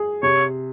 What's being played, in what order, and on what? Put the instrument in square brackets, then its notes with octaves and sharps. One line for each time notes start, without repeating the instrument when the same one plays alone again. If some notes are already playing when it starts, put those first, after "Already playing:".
Already playing: [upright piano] G#4
[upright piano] C3 [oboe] C#5